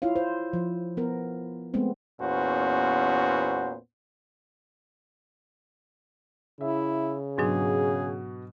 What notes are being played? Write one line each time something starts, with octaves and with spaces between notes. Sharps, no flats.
E4 F4 C#5 F5
C5
F3
B3 A#4
G#3 A3 B3 C4
E2 A#2 B3 C#4 F#4 C5
C#3 E4 E5
G#2 B2 F#3 D4 F#4 G#4